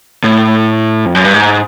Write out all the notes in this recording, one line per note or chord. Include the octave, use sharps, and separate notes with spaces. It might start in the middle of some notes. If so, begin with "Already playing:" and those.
A2
F2
F#2
G2
G#2